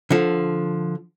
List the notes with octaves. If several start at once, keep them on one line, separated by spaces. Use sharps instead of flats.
D3 F3